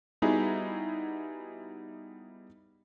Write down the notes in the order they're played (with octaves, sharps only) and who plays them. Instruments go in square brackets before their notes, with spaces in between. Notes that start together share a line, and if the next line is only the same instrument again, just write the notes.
[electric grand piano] G3 B3 D#4 E4 F#4 G#4